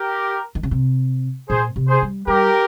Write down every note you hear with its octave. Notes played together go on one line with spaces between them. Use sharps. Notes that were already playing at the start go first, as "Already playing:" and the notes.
Already playing: G4 A#4
D#3
C#3
C3
A#2 G#4 C5
C3
G#4 C5
G3
G3 G4 A#4